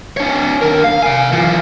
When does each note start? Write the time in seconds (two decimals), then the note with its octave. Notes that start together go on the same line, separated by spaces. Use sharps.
0.17 D4 C#5
0.61 D#2 A#4
0.84 F5
1.03 F5 G#5
1.32 E3 F4